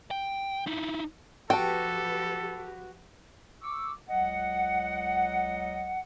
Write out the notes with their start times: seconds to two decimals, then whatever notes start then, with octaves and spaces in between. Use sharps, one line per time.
0.11 G5
0.67 D#4 E4
1.50 F3 F#4 G4 A4 B4 G5 A5
3.62 C#6 D6 E6
4.09 C#2 F#3 D#5 F#5